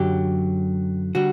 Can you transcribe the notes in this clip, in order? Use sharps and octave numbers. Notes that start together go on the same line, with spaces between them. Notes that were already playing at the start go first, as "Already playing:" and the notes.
Already playing: F#2 D3 F#3 G4
D3 G3 F#4